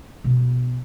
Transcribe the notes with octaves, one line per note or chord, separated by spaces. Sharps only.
B2 B3